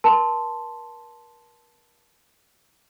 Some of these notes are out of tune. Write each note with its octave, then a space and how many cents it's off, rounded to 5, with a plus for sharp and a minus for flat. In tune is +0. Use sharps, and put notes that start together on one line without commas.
A#4 +40 A5 +0 C6 +0